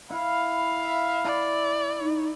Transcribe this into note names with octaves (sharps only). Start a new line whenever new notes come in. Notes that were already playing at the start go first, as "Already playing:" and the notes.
E4 F5 B5
E5
E4 D5
D#4